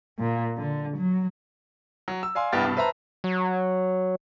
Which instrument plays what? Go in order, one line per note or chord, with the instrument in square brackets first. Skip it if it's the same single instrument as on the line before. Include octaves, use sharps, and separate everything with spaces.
[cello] A#2
D3
F#3
[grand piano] F#3
E6
D5 F5 G#5 C6
C2 G2 B3 G5 F6 A6
G2 B2
B4 C5 E5 A5 A#5
[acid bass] F#3